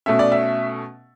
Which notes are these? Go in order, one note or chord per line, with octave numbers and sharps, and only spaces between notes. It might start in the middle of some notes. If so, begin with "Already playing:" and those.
B2 A3 C#4 E5
D5
E5